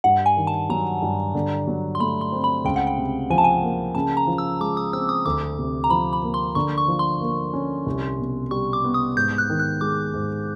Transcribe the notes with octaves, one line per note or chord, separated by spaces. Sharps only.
G2 F#5
G#5
D#3
A5
F#3 A#5
G2
D3
F#3
C6
A3 B5
C6
C4
B5
C#2 G5
F#5
G5
C3
F3 G#5
A5
G#5
A#3
C#3 A5
A#5
F3
E6
G#3 D6
D#6
C4 E6
D#6
D2 D6
C3
A#5
F3 B5
B5
A#3
C6
D3 C#6
C#6
F3
C6
A#3
C#4
C2
B2
G3 C#6
D6
B3
D#6
G#2 G6
F#6
D#3
F#6
G#3 D6
G#2